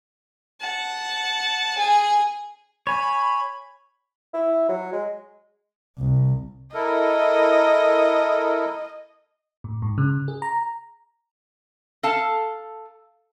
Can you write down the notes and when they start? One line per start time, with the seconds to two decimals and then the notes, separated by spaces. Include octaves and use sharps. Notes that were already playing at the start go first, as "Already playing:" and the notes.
0.61 F#5 A5
1.78 G#4 G#5
2.87 C#5 G#5 B5
4.34 E4
4.69 F#3
4.93 G#3
5.98 C2
6.74 E4 A4 A#4 D#5
9.64 A2
9.82 G#2
9.98 C#3
10.28 G#4
10.42 A#5
12.03 A4 F5 A5